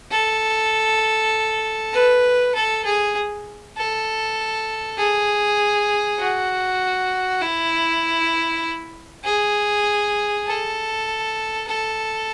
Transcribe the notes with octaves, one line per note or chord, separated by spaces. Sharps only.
A4
B4
A4
G#4
A4
G#4
F#4
E4
G#4
A4
A4